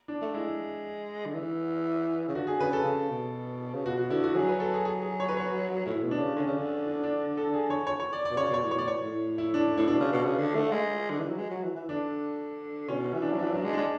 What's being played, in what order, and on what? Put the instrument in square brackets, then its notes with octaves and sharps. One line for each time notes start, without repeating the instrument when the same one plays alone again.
[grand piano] D4
[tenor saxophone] A3
[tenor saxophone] G#3 [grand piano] E4
[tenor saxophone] D3
E3
C#3
[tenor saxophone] D3 [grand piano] F#4
[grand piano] G#4
[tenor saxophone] C#3 [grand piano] B4
[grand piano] A4
[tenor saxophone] C#3
B2
C#3
[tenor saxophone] B2 [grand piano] F#4
[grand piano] F#4
[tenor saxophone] D3 [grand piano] E4
[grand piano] F#4
[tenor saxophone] F#3 [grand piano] G#4
[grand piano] B4
A4
G#4
G#4
G#4
C#5
B4
C#5
[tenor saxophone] A2 [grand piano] E4
[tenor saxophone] B2
[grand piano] D4
[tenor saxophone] C#3
[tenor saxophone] D3 [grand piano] C#4
[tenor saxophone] C#3
D3
[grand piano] D4
D4
A4
G#4
C#5
C#5
C#5
D5
D5
[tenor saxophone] B2
[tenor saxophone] C#3 [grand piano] C#5
[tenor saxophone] B2 [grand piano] C#5
[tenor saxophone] A2
[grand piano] C#5
[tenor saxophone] B2 [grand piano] D5
[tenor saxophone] A2 [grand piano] C#5
[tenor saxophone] A2
[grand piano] E4
D4
[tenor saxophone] A2 [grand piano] E4
[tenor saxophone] B2 [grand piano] D4
[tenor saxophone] C#3
B2
C#3
D3
A3
G#3
D3
E3
F#3
G#3
F#3
E3
E3
[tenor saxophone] D3 [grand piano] D4
[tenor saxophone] B2 [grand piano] C#4
[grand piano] C#4
[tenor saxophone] E3
[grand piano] D4
[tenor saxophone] F#3
[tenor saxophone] E3 [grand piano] D4
[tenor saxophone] F#3 [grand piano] D4
[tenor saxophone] G#3
[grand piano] D4
[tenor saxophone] G#3